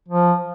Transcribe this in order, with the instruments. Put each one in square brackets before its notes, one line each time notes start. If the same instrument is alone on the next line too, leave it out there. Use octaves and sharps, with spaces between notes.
[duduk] F3